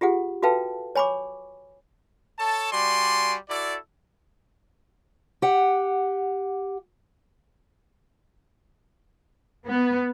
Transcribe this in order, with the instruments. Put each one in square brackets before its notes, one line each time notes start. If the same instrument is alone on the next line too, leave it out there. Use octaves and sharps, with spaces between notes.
[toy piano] F4 G4 G#4 F#5
F#4 A4 B4 F5 G5 A5
C#5 G#5 B5 C#6 D6
[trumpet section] A4 C#5 A5
G3 F#4 D5 G#5 C6
E4 F#4 A4 D5
[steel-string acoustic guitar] G4 F#5
[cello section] B3